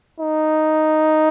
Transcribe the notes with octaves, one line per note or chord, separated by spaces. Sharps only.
D#4